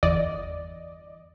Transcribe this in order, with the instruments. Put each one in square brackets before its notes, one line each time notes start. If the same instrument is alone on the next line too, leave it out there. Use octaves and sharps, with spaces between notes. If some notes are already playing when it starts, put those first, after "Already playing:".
[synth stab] G1 E2 D5 D#5